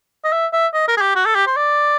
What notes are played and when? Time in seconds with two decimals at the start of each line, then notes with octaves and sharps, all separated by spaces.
0.24 D#5
0.32 E5
0.53 E5
0.74 D#5
0.88 A#4
0.97 G#4
1.01 G4
1.15 F#4
1.26 A4
1.35 G4
1.46 C5
1.56 D5